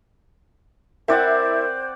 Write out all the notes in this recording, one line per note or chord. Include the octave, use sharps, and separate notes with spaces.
C4 E4 A#4 C5 D5 F#5